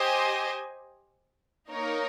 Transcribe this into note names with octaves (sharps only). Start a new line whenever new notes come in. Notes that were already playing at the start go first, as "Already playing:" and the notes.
Already playing: G4 C5 D#5 G#5
A#3 D#4 A#4 C#5